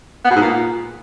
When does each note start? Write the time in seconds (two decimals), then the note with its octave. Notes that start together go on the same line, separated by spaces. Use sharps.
0.25 B3
0.30 B2
0.36 G#2
0.41 A#2